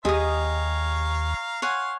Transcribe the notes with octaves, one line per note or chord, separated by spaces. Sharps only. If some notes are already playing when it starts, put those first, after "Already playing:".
D#2 G4 G#4 C#5 D#5 F5 A#5 D#6
C#5 F5 F#5 G#5 C6